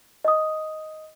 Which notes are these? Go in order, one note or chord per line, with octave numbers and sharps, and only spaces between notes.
D#5 D#6